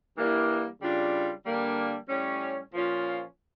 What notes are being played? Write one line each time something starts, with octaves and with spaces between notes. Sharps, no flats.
G2 E3 G3 A#3 E4
C#3 G3 D4 F4
D3 G3 A#3 D4
A2 G3 C#4
A#2 F3 C#4 F4